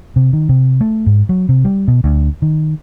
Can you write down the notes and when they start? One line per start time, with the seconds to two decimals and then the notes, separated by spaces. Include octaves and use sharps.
0.16 C3
0.33 D#3
0.49 C3
0.81 A3
1.06 G#2
1.29 F#3
1.49 C3
1.65 G3
1.88 B2
2.04 D2
2.42 D#3